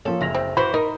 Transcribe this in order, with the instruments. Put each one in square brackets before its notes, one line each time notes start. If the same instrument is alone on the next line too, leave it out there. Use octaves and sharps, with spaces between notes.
[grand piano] F3 A#3 C#4 [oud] A4
[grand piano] F#1 A#6 F7 [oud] E4
[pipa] C4
[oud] E3 [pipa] F#4 C5 [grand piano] B5
[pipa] D#4 [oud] A#4